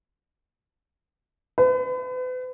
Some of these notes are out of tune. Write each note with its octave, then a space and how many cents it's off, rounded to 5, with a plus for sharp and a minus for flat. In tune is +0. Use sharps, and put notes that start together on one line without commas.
B4 +40